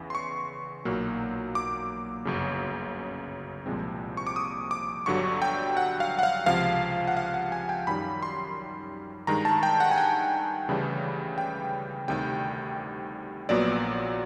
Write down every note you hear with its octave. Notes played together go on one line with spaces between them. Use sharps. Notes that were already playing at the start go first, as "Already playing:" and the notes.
Already playing: E2 C#3 E3
C6
C#6
B1 A#2 F#3 A#3
D6
G1 F#2 C#3
C2 A#2 F3 G#3 C4
C#6
D6
D#6
D6
G1 G2 D3 F#3 C#6
G5
F#5
F5
F#5
F5
C#2 C3 F3 F5
F#5
F5
F#5
G#5
G5
F#2 D#3 G3 B5
C6
G2 D#3 G#3 A#5
A5
G5
F#5
G#5
G5
D2 C#3 E3 G3
G5
D2 C3 D#3 G3 G5
A#1 A#2 F#3 B3 D5